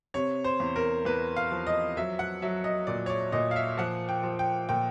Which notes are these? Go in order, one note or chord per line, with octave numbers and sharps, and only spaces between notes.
C3 C#5
C5
E2
A#4
E2 B4
F5
F3
D#5
F#3 E5
F#5
F#3 E5
D#5
A#2 D5
C#5
D5
A#2 D#5
F5
E5
F3 F#5
G5
F3
G5
A#2 G5